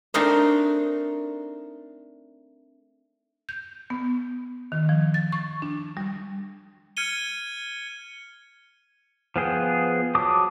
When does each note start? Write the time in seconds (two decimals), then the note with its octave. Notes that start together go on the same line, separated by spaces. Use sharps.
0.14 A3 C4 D4 D#4 A#4 D#5
3.49 G6
3.90 B3
4.72 D#3
4.89 F3
5.14 A6
5.32 C#6
5.62 D4
5.97 G3
6.97 F6 G#6 C#7 D#7 G7
9.36 F3 B3 G#4 G5
10.15 F#3 A5 D6 D#6